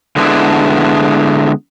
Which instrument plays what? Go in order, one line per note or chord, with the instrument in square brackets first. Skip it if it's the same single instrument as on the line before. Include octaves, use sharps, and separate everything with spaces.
[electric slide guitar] D3 G#3 B3 D4 E4